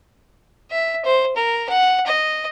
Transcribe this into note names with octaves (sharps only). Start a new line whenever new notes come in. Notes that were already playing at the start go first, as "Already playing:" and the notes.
E5
C5
A#4
F#5
D#5